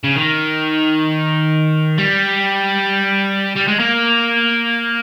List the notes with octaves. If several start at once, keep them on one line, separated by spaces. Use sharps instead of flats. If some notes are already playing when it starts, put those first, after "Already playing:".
C#3
D#3
G3
G3
G#3
A#3